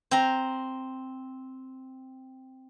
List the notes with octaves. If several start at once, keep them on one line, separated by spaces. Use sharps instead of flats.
C4 A#5